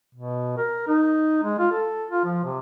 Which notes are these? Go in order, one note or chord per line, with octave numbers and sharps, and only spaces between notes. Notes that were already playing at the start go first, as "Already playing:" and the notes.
B2
A#4
D#4
G#3
F4
A4
F4
F3
C3